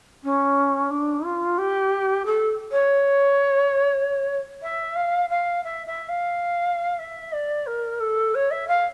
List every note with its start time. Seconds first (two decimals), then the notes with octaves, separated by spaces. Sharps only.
0.23 C#4
0.90 D4
1.24 F4
1.58 G4
2.25 A4
2.71 C#5
4.62 E5
4.95 F5
5.29 F5
5.63 E5
5.86 E5
6.08 F5
6.98 E5
7.32 D5
7.66 A#4
8.00 A4
8.34 C#5
8.50 E5
8.67 F5